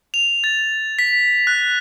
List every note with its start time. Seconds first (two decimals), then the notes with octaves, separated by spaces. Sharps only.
0.14 F7
0.44 A6
0.99 B6
1.47 F#6